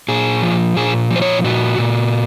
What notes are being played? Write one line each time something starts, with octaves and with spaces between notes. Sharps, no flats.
A#2 G#4
F3
A#2 G#4
F3
C5
C#5
A#2 F#4
A#2